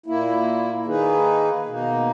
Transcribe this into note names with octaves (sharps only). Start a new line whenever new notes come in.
A#2 A#3 E4
D#3 A#3 D#4 G#4 B4
B2 A#3 D#4